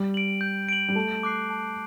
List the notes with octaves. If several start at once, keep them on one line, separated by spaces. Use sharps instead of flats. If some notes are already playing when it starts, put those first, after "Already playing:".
Already playing: G3
D7 F#7
G6
D7 F#7
G3
A3 A5
D6 F#6 C7
A5